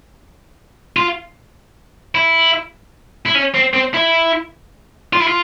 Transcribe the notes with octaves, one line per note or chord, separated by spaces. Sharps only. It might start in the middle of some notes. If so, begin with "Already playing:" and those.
F4
E4
E4
C#4
C4
C4
E4
F4
E4
F4